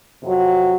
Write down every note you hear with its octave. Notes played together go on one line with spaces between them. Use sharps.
F2 C3 F#3